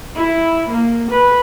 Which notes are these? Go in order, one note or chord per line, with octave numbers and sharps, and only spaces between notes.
E4
A#3
B4